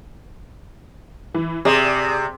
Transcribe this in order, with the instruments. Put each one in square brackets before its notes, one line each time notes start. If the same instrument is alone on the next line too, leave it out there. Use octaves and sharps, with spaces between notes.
[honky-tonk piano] E3
[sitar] C3 [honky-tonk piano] G#4 D5